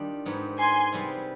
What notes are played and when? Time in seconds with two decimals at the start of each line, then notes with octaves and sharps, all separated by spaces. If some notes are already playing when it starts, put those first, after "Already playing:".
Already playing: D#3 G3 D4 F4
0.25 G#2 G3 B3
0.58 G#5 C6
0.92 C3 G3 B3